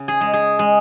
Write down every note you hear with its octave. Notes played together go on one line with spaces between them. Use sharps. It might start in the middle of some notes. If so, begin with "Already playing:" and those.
Already playing: C#3
G#4
G#3
G#4
G#3